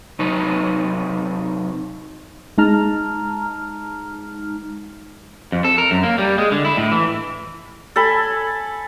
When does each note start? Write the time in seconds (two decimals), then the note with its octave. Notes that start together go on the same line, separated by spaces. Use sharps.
0.19 C3 F#3 D#4 B4
2.58 G#3 D#4 A5 A#5 F6
5.52 F2
5.65 A4
5.78 A#4
5.91 F#2
6.03 A#3
6.18 G3
6.38 G#3
6.52 D3
6.65 E4
6.77 A2
6.92 E3
7.96 A4 G#5 B5